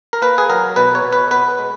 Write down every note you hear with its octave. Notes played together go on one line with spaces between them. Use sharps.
A#4
A#3 B4
G#4
F#3 A#4
B2 B4
C#5
B2
B4
B3 B4
G#3